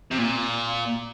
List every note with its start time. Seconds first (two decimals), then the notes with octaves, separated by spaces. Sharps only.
0.11 C3
0.18 A#2